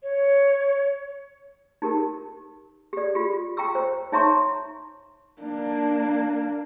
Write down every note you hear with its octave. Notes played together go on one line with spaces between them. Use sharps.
C#5
D#4 G4 A#4
G4 D5
F4 G4
G5 A#5 C#6 E6
C5
D#4 C#5 E5 A#5 C6 C#6
A#3 D4